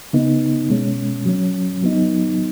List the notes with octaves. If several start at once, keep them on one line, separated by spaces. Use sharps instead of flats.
C#3 B3 D#4
B2 G#3 C#4
F#3 C#4
F#3 B3 D#4